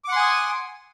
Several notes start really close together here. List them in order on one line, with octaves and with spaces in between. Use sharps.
D6 F#5 C6 G#5 D#6